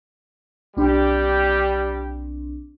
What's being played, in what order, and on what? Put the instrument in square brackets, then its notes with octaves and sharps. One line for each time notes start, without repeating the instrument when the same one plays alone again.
[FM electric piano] B1 C4 D4 [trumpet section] G3 G4